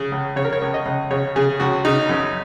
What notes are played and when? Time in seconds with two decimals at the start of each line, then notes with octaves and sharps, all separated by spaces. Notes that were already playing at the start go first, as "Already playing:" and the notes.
Already playing: C#3
0.12 C#2
0.36 C#3 C#5
0.45 A#4
0.53 C#5
0.62 C#2
0.74 D#5
0.85 C#2
1.11 C#3 C#5
1.36 C#3 G#4
1.60 C#2 F#4
1.85 C#3 D#4
2.09 F#2